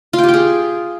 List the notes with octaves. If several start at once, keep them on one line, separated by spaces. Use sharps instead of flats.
F4
G5
G4
G5
G#4